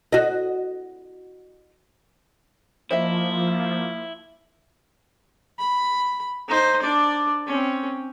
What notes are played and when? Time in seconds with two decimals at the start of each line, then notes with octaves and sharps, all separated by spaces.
0.13 F#4 D#5
2.91 F3 A#3 E4 C5 D#5 E5
5.59 B5
6.48 D#4 C5
6.82 D4 D5
7.47 C4 C#4